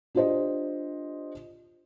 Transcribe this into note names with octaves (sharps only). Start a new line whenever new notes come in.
D4 F4 G4 C5 D#5